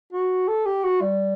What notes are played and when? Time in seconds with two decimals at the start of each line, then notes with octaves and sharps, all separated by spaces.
0.13 F#4
0.48 A4
0.66 G4
0.84 F#4
1.02 G3